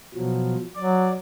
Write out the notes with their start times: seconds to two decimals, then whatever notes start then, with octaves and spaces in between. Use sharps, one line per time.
0.15 B2 F3 F#3
0.76 F#3 D5